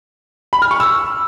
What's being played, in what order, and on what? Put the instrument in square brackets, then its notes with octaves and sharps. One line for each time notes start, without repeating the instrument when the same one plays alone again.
[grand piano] B5
F6
C#6
E6